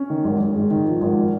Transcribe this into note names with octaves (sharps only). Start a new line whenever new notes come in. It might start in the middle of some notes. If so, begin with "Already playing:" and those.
Already playing: C#4
D#3
G#1
G#1
G#2
D#3
F3
G#1